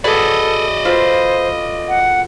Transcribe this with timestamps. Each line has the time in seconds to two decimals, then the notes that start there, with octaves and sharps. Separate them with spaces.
0.04 F#4 G#4 A4 B4 D5 D#5
0.85 F4 A4 B4 C5
1.89 F#5